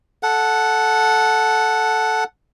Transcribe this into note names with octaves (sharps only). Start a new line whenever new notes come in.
A4 F#5